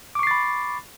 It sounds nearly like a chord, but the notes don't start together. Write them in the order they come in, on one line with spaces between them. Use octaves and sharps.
D6 C#6 C7 A6 B5